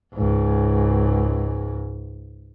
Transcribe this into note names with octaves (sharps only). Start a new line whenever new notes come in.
C#2 G#2